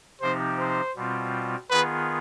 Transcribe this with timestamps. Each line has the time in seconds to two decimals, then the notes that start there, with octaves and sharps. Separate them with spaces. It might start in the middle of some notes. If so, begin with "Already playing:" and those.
0.22 C3 F3 C4 D#4 G4 C5
0.59 C5
0.96 B2 G3 C4 F4
1.70 D#3 B3 F4 G#4 B4